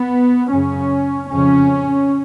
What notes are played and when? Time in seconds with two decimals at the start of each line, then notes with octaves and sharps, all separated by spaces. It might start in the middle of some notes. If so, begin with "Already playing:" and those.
Already playing: B3
0.50 F#2 C#3 C#4
1.30 F2 C#3 C#4